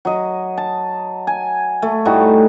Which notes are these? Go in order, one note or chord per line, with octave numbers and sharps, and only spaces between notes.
F#3 D#5
A5
G#5
A3
A2 G3 D#4 F#4